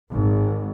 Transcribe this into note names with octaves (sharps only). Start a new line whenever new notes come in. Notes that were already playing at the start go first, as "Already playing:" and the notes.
G#1